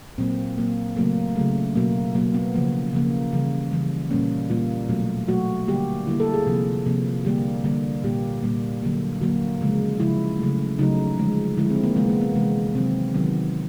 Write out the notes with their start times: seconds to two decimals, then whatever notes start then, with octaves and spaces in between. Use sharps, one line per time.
0.18 A#2 F#3 A#3 C4
0.58 A#2 F#3 A#3
0.96 C#3 F#3 A3 A#3
1.36 C#3 F#3 A3
1.75 B2 F#3 A#3
2.15 B2 F#3 A#3
2.34 B3
2.54 C#3 F3 A#3
2.93 C#3 F3 A#3
3.33 C#3 E3 G3
3.71 C#3 E3 G3
4.10 A#2 G3 A#3 C#4
4.50 A#2 G3 A#3 F4
4.89 B2 F#3 A3
5.28 B2 F#3 A3 F#4
5.67 D3 G3 A#3 G4
6.07 D3 G3 A#3 E4
6.20 A4
6.34 G#4
6.47 C3 F3 A#3
6.86 C3 F3 A#3
7.25 D3 G3 A#3 G4
7.64 D3 G3 A#3
8.04 A#2 G3 A#3 G4
8.43 A#2 G3 A#3
8.83 D3 F#3 A#3
9.21 D3 F#3 A#3 F#4
9.61 C#3 F3 G#3
10.00 C#3 F3 G#3 E4
10.39 C#3 F#3 A3
10.79 C#3 F#3 A3 D#4
11.18 D3 F3 G#3
11.57 D3 F3 G#3 E4
11.70 C4
11.83 A#3
11.96 C3 E3 G#3 B3
12.09 A#3
12.21 B3
12.35 C3 E3 G#3
12.75 C3 D#3 F#3 C4
13.14 C3 D#3 F#3 B3